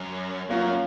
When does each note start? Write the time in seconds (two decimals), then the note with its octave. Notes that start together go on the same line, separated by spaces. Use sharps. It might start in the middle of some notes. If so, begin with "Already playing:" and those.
Already playing: F#2
0.49 F#2 A#3 C#4 F4